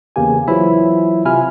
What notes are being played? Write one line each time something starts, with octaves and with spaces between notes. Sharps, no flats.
E2 C#3 A#3 G4 G#5
E3 F#3 E4 F4 C5 E5
C3 F4 E5 G#5 B5 F6